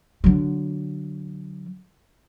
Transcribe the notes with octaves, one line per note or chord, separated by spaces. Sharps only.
D3 F#3